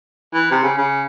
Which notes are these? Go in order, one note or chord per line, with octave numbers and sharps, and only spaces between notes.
E3
C3
C#3
C#3